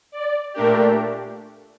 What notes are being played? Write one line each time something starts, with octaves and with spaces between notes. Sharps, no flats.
D5
A#2 A3 D4 G4 A#4